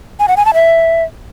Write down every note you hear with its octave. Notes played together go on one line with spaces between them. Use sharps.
G#5
F#5
G#5
A5
E5